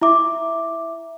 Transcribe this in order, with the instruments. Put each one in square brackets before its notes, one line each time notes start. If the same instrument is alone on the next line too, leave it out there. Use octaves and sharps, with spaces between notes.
[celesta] E4 E5 D6